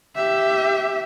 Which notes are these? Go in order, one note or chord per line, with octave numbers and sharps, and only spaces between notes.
G4 E5